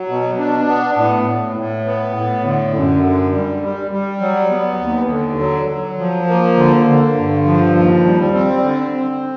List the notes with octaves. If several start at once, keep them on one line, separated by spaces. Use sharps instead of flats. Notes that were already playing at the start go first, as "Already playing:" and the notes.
Already playing: F#3
B2
D4
B3
A2
A2
A2
B3
A2
D3
F#2
D3
G3
G3
G3
F#3
B3
D#2
D3
F#3
F#3
F3
A#3
D3
D3
G2
F3
D#2
G3
C4
D3
C4